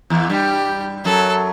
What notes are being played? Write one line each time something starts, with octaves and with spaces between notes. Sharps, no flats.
E2 E3
G2 G3 G4
F#2 F#3 A4